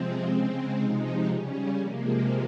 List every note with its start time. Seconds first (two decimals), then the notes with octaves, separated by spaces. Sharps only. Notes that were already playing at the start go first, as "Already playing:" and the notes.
Already playing: C3 F3 G#3 C4
0.25 C#3 G#3
0.76 C3 F3 G#3 D#4
1.26 C#3 G3 C#4
1.78 C3 F3 G#3 A#3